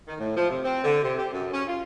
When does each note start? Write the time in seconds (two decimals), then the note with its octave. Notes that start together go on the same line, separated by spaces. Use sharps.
0.08 D#3
0.19 A2
0.35 F3
0.50 C3
0.64 C4
0.84 D3
1.03 C3
1.18 G4
1.32 F#2
1.53 C#4
1.67 F4